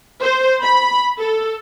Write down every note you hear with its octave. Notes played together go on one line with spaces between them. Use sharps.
C5
B5
A4